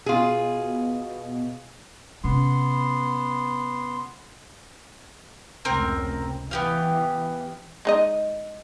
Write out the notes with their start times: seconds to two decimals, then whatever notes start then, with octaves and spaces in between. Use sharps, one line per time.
0.06 B2 F4 G#4
2.24 C3 B3 C#4 C6
5.65 F1 C#2 A2 C4 A#4
6.51 E3 B3 G4 F5
7.85 G#3 D#4 D#5